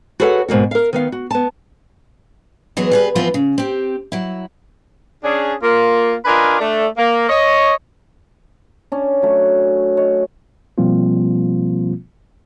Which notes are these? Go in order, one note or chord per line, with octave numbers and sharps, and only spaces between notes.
F#4 G#4 A4 B4 C#5 F#5
G#2 B2 A#3 F#4
A#4 F5
D#3 B3 F5
F#4
B3 A5
E3 F#3 G#3 B3 G#4
G3 G#4 B4
E3 F3 B3 C4 F4 B4
C#3
C4 G4
F#3 E4
C#4 D4 G#4
A#3 F4
D4 F4 A#4 B4 D#5 G#5
A3 D4
A#3
C#5 D#5
C#4 D4
F#3 A3
C#5 D#5
B2 F3 G3 A#3 C4 F4